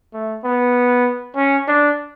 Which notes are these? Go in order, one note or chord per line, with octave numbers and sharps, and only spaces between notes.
A3
B3
C#4
D4